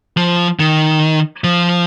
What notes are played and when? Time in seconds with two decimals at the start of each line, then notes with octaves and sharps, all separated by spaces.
0.17 F3
0.60 D#3
1.44 F3